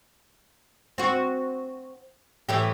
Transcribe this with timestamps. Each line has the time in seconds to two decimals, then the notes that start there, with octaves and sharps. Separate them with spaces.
0.98 C4 F#4
2.49 A2 E3 G4